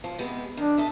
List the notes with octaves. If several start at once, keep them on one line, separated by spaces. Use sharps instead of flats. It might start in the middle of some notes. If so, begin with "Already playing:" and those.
F3
C3 G#3 B3
D#3 D4
A4 D#5 E5